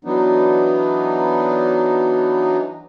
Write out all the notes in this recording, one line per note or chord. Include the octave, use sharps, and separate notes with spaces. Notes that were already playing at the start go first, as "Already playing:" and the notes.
E3 F#3 B3 D4 D#4